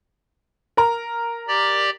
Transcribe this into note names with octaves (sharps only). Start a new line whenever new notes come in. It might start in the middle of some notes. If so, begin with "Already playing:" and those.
A#4 A#5
G4 D5